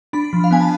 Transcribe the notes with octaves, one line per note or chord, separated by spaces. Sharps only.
D4 B5
F3
F5
B3 G#5
A5